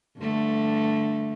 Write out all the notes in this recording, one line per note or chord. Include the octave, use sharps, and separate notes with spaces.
G2 D3 A3